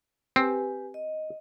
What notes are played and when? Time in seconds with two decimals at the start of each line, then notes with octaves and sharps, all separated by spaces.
0.36 C4 G4 B4 G#5
0.94 D#5